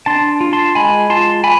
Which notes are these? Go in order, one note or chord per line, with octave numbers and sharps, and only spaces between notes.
D4 A5 C6
F4
A5 C6
G#3 G#5 B5
F4 A5 C6
G#5 B5